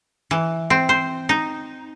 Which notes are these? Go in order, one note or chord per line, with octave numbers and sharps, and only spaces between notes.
E3
C4
C5
D#4